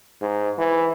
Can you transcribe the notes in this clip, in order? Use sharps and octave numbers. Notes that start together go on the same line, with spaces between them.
G#2
E3